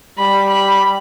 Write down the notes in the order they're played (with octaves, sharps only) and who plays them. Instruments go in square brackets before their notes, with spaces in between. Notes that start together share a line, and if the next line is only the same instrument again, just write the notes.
[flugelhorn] G3 [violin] B5
[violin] B5